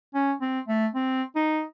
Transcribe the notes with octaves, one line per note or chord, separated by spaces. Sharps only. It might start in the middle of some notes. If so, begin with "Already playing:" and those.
C#4
C4
A3
C4
D#4